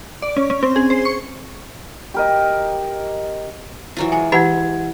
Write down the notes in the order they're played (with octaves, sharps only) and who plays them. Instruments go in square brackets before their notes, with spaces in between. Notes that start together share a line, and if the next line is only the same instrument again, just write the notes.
[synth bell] D5
C#4
C#4
C4
G#4
C5
C#6
[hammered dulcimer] G4 A#4 D#5
[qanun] E3 F#3 F4
[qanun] G#3 [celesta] G#5
[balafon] E3 E4 A5 [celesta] G4 F#5 G#6 [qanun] E5